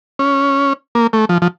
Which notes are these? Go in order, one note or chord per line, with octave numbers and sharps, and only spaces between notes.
C#4
A#3
A3
F3
F3